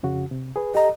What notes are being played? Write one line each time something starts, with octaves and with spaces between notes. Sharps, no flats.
F2 C#3 F#4
C3
G#4 B4
G4 A4 D#5 A#5